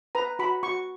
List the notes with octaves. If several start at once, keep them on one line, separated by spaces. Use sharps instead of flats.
B4 A#5
F#4 B5
F#4 C#6